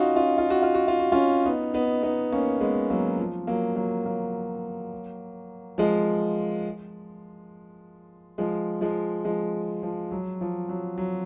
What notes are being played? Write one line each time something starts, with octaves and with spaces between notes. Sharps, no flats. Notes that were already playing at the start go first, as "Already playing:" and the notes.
Already playing: C#4 D#4 F4 F#4
C#4 F4
F4
F#4
F4
F#4
F4
F#4
C#4 F4
B3 D#4
B3 D#4
B3 D#4
A#3 C#4
G#3 B3
F#3 A#3
F3
F#3 A#3
F#3 A#3
F#3 A#3
F3 G#3
F3 G#3
F3 G#3
F3 G#3
F3
F#3
F3
F#3
F#3